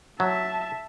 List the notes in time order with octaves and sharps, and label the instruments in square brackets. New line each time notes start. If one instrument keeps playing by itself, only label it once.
[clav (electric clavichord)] F#3 [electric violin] E5 A5